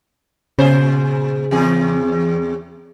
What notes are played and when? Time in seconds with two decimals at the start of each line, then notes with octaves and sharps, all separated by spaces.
0.59 A#2 C#3 G#4 C5
1.51 E2 G#4